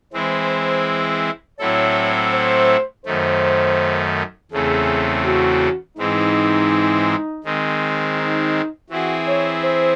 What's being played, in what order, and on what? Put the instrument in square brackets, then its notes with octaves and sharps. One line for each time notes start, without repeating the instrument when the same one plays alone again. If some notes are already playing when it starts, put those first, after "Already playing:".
[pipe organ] E3 G#3 C4 E4 [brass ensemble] C5
[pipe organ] A2 F#3 C4 E4 A4 [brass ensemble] C#5
[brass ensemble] C5
[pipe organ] F#2 D#3 A3 [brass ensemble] C5
[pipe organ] E2 C#3 E3 A3 C4 [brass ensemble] G#4
[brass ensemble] F#4
[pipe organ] G#2 E3 G#3 C4 [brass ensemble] D#4
[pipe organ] D#3 G#3 C4
[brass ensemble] D#4
[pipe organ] E3 C4 E4 G#4 [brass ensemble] F#4
[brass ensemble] C#5
C5